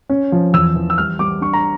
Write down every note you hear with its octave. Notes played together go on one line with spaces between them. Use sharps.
C#4
F3
E2 E6
E3
E6
G3 F6
G3 D6
D4 C#6
A#5